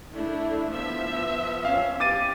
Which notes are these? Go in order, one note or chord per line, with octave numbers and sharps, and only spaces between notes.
A3 D4 E4
F3 B3 E5
C#4 F5
G4 D6 A6 D#7